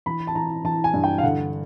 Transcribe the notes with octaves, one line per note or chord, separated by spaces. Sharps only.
E3 B5
A5
E3 A#5
E3 A5
G#5
G2
G5
F5
D3 F#5